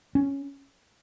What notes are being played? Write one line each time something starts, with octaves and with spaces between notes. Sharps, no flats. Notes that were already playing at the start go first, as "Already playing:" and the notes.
C#4